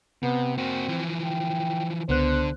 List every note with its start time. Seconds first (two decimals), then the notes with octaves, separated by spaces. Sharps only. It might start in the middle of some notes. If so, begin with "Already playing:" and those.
0.23 C3 B3
0.57 A#3 C4 F#4
0.88 E3 F3
1.23 G5
2.09 C#2 D3 B3 C5 F#6